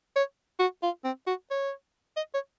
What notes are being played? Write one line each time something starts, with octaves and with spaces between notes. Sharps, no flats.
C#5
F#4
F4
C4
F#4
C#5
D#5
C#5